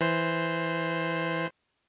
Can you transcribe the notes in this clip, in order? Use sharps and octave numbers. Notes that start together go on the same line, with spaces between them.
E3 C5